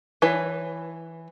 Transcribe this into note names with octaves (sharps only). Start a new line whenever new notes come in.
E3 B4 C#5